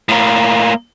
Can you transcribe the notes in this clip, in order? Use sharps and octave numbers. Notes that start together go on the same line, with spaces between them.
A2 A#3